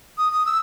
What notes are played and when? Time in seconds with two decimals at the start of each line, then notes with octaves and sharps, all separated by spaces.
0.18 D#6
0.32 D#6
0.46 E6